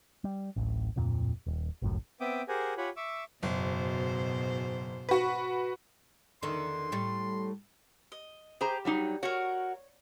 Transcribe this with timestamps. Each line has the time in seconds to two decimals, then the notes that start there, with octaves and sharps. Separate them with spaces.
0.24 G3
0.56 D1 A1
0.96 D1 F2 A#2
1.46 D#1
1.82 G#1 C#2 F#2 A2
2.21 B3 C4 E5 G5 D6 D#6
2.48 G4 G#4 A#4 C5 F#5 G#5
2.78 F4 G4 C#5 F#5 G#5 B5
2.97 E5 C#6 D6 E6
3.43 F#1 G#2 B2 C5
5.09 F#4 B4
6.42 E2 D3 D#3 C6
6.92 A2 G3
8.12 D#5
8.61 G4 G#4 C5 A#5
8.85 F#3 G3 D#4
9.23 F#4 A#4 C#5